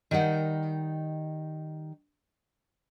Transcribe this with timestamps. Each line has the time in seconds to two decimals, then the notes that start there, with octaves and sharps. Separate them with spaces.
0.11 D#3 G3 D#4 F#5